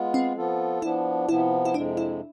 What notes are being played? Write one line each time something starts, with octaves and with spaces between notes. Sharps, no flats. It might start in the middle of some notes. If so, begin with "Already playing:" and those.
Already playing: G#3 B3 F4
C4
F3 B3 F4 A4
F3 B3 D4 E4
C3 F3 B3 E4
E4
F2 C3 G#3 D4
E4